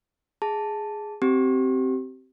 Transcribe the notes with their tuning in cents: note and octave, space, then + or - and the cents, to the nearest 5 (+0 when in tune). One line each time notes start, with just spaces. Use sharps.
G#4 +0 A5 +0
C4 +0 G4 -25